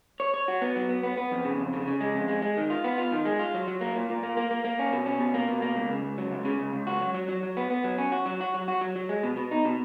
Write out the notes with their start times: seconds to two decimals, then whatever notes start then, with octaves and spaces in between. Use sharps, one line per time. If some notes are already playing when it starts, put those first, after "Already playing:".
0.20 C#5
0.34 C#5
0.48 F#4
0.61 B3
0.76 F#3
0.89 B3
1.03 B3
1.17 B3
1.31 F2
1.45 C#3
1.59 F2
1.73 C#3
1.87 C#3
2.01 G#3
2.15 F2
2.28 G#3
2.42 G#3
2.57 D#3
2.70 F4
2.84 B3
2.98 F4
3.12 D#3
3.25 G#3
3.39 F4
3.54 F#3
3.68 F#3
3.81 A#3
3.96 A#2
4.10 A#2
4.23 A#3
4.37 A#3
4.51 A#3
4.65 A#3
4.79 C#4
4.93 B2
5.06 C#4
5.20 B2
5.34 A#3
5.48 B2
5.62 A#3
5.76 C#2
5.90 C#3
6.04 C#2
6.18 F#3
6.31 C#2
6.45 C#3
6.60 C#2
6.73 C#2
6.87 F#4
7.01 F#3
7.14 F#3
7.29 F#3
7.43 F#3
7.57 B3
7.71 B3
7.84 F#3
7.98 C#4
8.12 F#4
8.26 F#3
8.41 F#4
8.54 F#3
8.68 F#4
8.81 F#3
8.96 F#3
9.09 G#3
9.23 B2
9.37 B2
9.51 D#4
9.65 B2